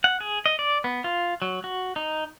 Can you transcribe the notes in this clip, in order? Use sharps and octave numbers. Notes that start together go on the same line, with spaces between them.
F#5
G#4
D#5
D5
B3
F4
F#3
F#4
D#4